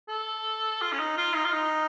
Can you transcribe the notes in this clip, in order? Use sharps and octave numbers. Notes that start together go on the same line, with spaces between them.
A4
F4
C#4
D#4
F4
D#4
F4
D#4